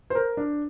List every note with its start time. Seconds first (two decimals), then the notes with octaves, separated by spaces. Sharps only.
0.10 C5
0.15 A#4
0.37 D4